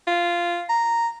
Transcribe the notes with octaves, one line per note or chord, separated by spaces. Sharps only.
F4
A#5